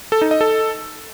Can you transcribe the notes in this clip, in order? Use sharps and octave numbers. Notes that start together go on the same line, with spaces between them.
A4
D#4
D#5
A4